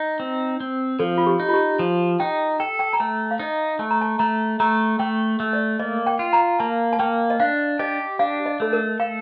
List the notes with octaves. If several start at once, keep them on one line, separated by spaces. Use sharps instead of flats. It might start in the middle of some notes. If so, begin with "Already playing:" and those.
Already playing: D#4
C4
C4
F3 A4
F4
G4
D#4
F4
G4
F3
D#4 G5
A4 G5
G5
A#5
A3 A5
F5
D#4 D#5
A3 A5
A#5
A5
A3 A#5
A3 A#5
A3 G5
A3
D5
A#3 D#5
G5
F4
A#5
A#3 A5
A5
A#3 G5
D#5
D4 F5
G4 D#5
D4 F5
D#5
A3 A4
A#4
A4 F5